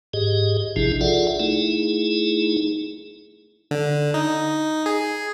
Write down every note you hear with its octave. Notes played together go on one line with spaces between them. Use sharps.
G#2 G4 G#4 D#5
A1 C3 F3 D4 E4 G#4
F4 G#4 A4 D5 E5 F#5
A3 D#4 E4 G#4
D3
D#4
G#4